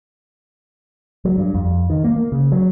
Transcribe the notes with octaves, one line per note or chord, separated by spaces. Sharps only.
F#3
G2
F2
D#3
A#3
A#3
C#3
F#3